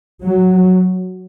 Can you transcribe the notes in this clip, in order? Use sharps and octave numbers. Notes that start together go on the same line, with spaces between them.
F#3